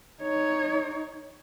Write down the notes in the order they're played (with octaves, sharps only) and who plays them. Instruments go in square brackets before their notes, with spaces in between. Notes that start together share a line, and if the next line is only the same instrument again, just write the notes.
[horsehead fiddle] D#4 C#5